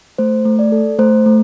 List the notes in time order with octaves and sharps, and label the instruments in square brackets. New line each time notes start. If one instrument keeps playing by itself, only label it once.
[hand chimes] A3 C5
A3
D5
A4
A3 C5
A3